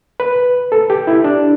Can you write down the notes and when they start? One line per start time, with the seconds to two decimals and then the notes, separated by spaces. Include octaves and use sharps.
0.20 B4
0.72 A4
0.90 G4
1.07 E4
1.24 D4